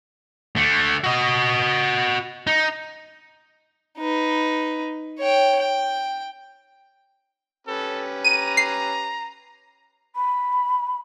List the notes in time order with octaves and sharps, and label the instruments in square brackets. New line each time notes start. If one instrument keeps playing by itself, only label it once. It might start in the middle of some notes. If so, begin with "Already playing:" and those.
[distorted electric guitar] D3 A3
F#4 D#5
D#4
[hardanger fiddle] D#4 B4
C#5 G5
G5
[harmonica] C#4 G4 B4 [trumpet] A4
[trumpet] A#5 [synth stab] D#7
[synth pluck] C7
[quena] B5